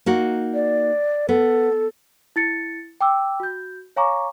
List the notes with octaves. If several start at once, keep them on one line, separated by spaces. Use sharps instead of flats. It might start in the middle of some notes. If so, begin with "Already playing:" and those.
A#3 D#4 F#4
D5
B3 A4
E4 A6 C#7
G5 D6 E6
F#4 G6
C#5 F5 G#5 A#5 C#6 D6